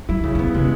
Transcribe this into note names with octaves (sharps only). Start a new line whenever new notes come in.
F#3 E4
C#3 E3
E3
D#3 B3
C#3 G#3